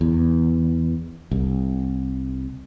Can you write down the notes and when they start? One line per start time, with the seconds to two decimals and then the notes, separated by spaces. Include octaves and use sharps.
0.01 E2
1.31 C2